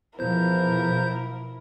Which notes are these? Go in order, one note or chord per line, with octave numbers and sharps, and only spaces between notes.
E2 B2 F3 E4 A#4 C5 G6